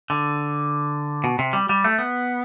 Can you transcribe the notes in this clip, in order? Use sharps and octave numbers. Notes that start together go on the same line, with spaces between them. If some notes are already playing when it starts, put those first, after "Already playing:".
D3
B2
C3
G3
G3
A3
B3